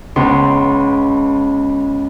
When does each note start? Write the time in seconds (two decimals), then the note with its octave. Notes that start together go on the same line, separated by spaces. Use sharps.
0.16 C#2 B3 C6